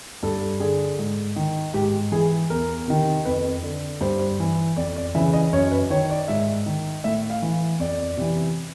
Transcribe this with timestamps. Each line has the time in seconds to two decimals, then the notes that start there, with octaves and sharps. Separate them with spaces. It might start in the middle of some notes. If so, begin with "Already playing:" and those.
0.23 G2 A4
0.60 D3 G#4
0.99 G#2
1.36 D#3
1.74 G#2 G4
2.12 E3 G#4
2.50 E2 A#4
2.88 C3 D#3
3.25 F2 B4
3.63 D3
4.01 G2 C5
4.40 E3
4.77 F2 D5
4.96 D5
5.15 C#3 E3 E5
5.34 D#5
5.53 F#2 C#5
5.71 B4
5.90 D#3 C#5
6.10 D5
6.28 G#2 E5
6.66 D#3
7.04 A2 E5
7.30 F5
7.42 E3
7.80 F2 D5
8.17 C3 E3